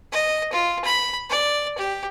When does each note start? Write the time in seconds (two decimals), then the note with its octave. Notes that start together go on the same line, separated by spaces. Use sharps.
0.12 D#5
0.53 F4
0.85 B5
1.30 D5
1.78 G4